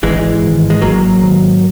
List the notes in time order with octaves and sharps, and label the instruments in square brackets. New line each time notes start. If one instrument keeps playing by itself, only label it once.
[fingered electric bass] G#1 [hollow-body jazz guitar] E3 G#3
[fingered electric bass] G#2 D#3
[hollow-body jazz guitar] G#3
[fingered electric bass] G#1 [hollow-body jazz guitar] F#3 A#3
[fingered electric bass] G#2 D#3